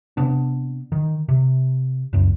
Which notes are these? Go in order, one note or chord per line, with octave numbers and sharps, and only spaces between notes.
C3 B3 D4
D#3
C3
C#2 F#2